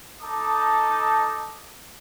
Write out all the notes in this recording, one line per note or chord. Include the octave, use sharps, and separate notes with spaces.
D#4 A4 D#5 A5 D6